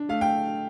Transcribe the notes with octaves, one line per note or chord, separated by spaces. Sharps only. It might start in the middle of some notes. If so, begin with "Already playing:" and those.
Already playing: D4
A3 F5
G5